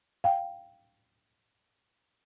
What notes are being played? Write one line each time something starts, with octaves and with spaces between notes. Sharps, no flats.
F5 G5